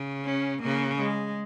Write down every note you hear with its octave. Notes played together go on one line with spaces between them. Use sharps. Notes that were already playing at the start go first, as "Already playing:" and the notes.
Already playing: C#3
C#4
C#3 A#3
G#3